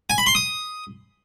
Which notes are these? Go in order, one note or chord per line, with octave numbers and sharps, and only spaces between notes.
G#5
B5
C6
D#6